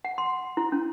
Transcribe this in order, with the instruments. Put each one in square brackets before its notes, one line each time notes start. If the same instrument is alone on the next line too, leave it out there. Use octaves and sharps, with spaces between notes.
[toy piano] F#5
C6
E4
C#4